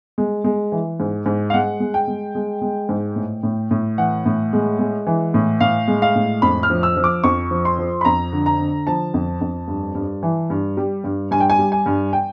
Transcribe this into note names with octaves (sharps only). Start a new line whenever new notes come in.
G#3
G#3
E3
G#2
G#2
F5
G#3 F#5
G#3
G5
G#3
G#3
G#3
G#2
A2
A2
A2
E3 F#5
A2
G#3
G#3
E3
A2
A2 F5
G#3
F5
A2
F2 B5
F6
F3
E6
F3
D6
F2 C#6
F3
C6
F3
B5
F2 A#5
D3
A#5
D3
F3 A5
F2
F2
G2
G2
E3
G2
G3
G2
G2 G#5
G5
G#5
G3
G#5
G2
G5